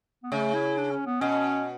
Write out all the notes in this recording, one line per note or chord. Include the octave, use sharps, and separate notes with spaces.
B3
C#3 A3
E4
D4
C#4
B3
B2 C#4